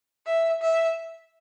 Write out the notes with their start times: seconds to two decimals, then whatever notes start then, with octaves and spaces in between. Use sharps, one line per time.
0.26 E5
0.62 E5